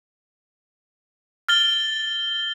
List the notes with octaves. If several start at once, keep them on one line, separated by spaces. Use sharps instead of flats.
F6 A6 G7